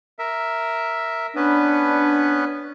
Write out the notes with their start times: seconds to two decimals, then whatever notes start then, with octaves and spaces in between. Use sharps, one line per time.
0.19 A#4 E5
1.36 B3 C#4 D4 B4